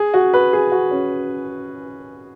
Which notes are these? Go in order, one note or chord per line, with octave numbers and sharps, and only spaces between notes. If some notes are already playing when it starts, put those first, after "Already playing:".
Already playing: G#4
F#4
B4
G#4
F#4
C#4